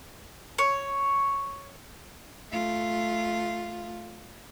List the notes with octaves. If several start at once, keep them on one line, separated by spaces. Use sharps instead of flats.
C#5
A3 F4